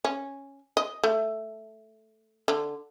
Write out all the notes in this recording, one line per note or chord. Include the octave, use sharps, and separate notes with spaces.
C#4
D#5
A3
D3